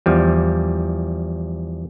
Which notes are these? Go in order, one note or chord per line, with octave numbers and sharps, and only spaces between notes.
E2 F3 G3